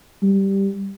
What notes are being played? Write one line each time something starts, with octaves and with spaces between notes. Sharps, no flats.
G3